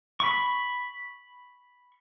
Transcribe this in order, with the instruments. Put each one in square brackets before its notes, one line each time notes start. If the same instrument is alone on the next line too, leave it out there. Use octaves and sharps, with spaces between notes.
[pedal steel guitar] B5 C#6